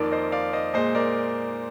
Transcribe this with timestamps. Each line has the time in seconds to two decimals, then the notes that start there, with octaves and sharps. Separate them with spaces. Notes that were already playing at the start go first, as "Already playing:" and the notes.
Already playing: F2 D#3 A#3 A#4 D5
0.11 C5 D#5
0.32 D5 F5
0.53 C5 D#5
0.74 A#2 G#3 C5 D#5
0.95 A#4 D5